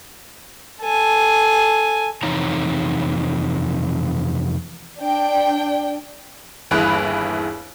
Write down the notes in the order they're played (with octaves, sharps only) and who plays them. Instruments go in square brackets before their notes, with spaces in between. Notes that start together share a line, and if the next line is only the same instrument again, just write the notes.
[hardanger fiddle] A4 G#5
[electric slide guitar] F2 C3 E3 D#4 C#5 A#5
[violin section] D4 G5
[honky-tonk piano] G1 D#2 E3 G#4 B5 F#6